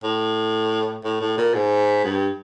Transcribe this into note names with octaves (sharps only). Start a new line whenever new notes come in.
A2
A2
A2
A#2
G#2
G2